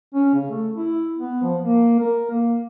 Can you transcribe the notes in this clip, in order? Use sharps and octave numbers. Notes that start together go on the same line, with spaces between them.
C#4
C#3
A3
E4
B3
F3
A#3
A#4
A#3